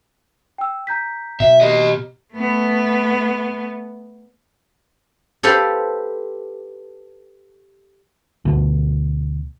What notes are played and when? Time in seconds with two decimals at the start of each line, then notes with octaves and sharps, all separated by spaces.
0.58 G5 E6
0.87 A#5 G6 B6
1.40 B2 E5
1.61 G4 D#5
2.34 A3 B3
5.43 G4 A4 B4 C5 F5
8.45 D2 B2